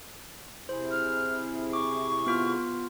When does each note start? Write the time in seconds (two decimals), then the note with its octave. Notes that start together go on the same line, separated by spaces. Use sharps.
0.69 C3 E4 G#4 C5
0.91 F6
1.73 C#6 D6
2.26 B3 F4 F6